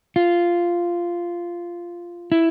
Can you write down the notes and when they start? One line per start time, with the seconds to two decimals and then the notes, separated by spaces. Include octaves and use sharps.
0.16 F4
2.32 E4